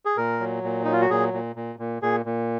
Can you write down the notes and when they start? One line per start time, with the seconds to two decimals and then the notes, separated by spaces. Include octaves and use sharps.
0.05 G#4
0.17 A#2 A#4
0.40 F#3
0.64 A#2
0.84 F#3 D#4
0.93 F4
1.02 F#4
1.10 A#2 G#4
1.34 A#2
1.56 A#2
1.79 A#2
2.02 A#2 G#4
2.26 A#2